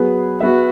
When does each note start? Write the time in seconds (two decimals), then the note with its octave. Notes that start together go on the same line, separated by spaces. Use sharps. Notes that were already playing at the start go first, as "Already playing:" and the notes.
Already playing: F#3 B3 G#4 B4
0.41 B3 F#4 G#4 B4 E5